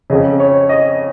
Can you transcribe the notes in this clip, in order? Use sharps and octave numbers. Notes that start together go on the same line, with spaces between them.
F2 C#3 D#5
C#5
D#5